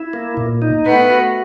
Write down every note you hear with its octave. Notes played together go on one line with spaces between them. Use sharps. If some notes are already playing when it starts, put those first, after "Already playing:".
Already playing: E4
A#3
A#2
D#4
A3 B3 B4
F#4